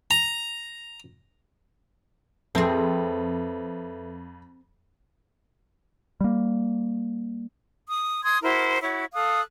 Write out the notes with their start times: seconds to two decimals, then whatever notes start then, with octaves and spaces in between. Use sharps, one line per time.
0.11 A#5
2.55 F2 C4 G#4 A4 B4 E5
6.21 G3 A#3
7.87 D#6
8.22 C6 D#6 G#6
8.43 E4 F#4 A#4 C5
8.82 E4 F#4 C#5
9.13 A4 F5 D#6 F#6